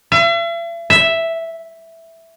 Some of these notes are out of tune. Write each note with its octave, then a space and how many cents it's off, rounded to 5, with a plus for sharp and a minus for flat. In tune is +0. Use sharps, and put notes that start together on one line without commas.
E5 +45
E5 +0